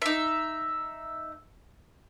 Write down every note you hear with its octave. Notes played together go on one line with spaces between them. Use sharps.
D#4 E5